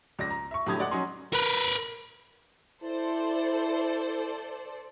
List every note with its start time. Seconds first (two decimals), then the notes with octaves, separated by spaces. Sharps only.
0.19 C#2 D5 A#6
0.30 A#5
0.51 E5 C#6
0.66 A2 D3 F#3 G4 D#6 G#6
0.78 G#3 D5 F#5
0.91 F#3 C#4 D#4 G#5 C6
1.33 A#4 B4
2.83 E4 A4 C5 D5